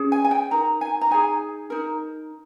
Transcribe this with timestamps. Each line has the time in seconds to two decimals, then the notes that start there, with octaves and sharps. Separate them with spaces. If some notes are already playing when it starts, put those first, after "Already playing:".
Already playing: C#4 G#4
0.12 G#5
0.24 G#5
0.31 G5
0.51 D#4 A#4 A#5
0.81 G#5
1.01 A#5
1.11 D#4 G#4 G#5
1.70 D#4 A#4